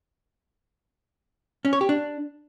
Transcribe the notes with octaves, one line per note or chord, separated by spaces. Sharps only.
C#4
C#5
G4
D4